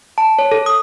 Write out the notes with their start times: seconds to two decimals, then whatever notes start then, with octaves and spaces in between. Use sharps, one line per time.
0.18 A5
0.39 C#5
0.51 A4
0.66 D#6